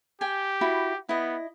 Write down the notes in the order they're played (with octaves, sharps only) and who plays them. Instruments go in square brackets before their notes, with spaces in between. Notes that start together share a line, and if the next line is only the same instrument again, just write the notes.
[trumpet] G4 [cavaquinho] G5 G#5
[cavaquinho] E4 F#4 B5
[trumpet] B3 [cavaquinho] E4 D#5